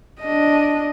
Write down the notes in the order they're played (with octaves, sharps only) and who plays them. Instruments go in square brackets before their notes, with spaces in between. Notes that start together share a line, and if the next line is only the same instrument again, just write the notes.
[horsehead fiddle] D4 D#5